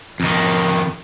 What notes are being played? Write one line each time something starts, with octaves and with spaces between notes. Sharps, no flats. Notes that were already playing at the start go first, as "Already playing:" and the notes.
F2 D#3